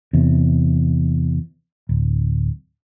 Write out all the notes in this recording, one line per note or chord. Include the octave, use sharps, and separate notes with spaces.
E2 C3
D1